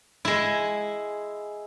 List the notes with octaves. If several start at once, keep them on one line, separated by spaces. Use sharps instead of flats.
G#3 E4